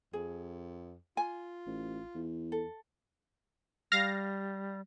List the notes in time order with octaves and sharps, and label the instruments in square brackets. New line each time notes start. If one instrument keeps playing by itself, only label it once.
[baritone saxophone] F2 [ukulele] G#4
[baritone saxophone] F4 [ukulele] G#5
[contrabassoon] A1
E2
[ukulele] A4
[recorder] G3 [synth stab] F5 A#6